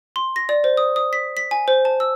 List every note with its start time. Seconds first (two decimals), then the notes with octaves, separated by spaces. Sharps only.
0.16 C6
0.36 A#6
0.49 D5
0.64 C5
0.77 D#6
0.96 D#6
1.13 B6
1.37 B6
1.51 G#5
1.68 C5
1.85 A5
2.00 E6